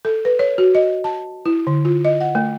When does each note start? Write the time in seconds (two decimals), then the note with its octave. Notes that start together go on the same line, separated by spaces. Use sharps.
0.05 A4
0.25 B4
0.39 C#5
0.58 F#4
0.75 D#5
1.04 A5
1.46 E4
1.67 D3
1.85 F4
2.05 D#5
2.21 F#5
2.35 A3